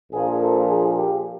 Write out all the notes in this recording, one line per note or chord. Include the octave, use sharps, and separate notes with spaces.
A#1 A#2 F3 A#3 G#4
A4
G#4
G4